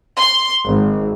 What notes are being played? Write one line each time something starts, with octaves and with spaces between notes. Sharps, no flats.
C6
G#1